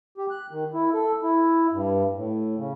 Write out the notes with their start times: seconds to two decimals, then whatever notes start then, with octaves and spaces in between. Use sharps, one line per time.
0.18 G4
0.31 F#6
0.51 D#3
0.74 E4
0.93 A4
1.23 E4
1.72 G2
2.16 A2
2.57 C#3